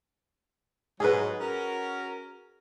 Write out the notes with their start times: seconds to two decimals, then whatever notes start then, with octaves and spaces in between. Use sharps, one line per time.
1.00 G#2 F#3 G#4 B4
1.41 C#4 F#4 A#4